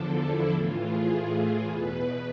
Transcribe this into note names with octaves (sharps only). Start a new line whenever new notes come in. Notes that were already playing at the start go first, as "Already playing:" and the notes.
Already playing: E2 D3 F3 D4 A4
E4
A2 E3 F4
G#4
E2 B2 B4